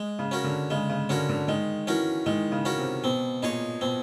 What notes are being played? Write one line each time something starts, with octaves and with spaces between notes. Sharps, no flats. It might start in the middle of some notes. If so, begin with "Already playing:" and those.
Already playing: G#3
C#3
C#4 F#4 A#4
D3
C#3 G#3
C#3
D3 C#4 F#4 A#4
D3
D#3 G#3
E3 C#4 F#4 A#4
D#3 G#3
C#3
C#4 F#4 A#4
C3
B2 C4
A#2 D#4 G#4 C#5
B2 C4